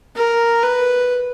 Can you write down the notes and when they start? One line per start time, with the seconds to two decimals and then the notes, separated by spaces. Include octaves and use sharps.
0.16 A#4
0.63 B4